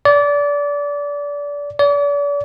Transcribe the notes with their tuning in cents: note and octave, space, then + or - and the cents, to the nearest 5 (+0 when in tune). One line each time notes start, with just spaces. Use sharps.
D5 -25
D5 -40